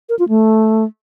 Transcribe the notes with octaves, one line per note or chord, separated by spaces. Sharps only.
A#4
F4
A3